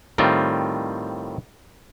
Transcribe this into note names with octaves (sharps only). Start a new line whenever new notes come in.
A2 D#3 G3 C4 F4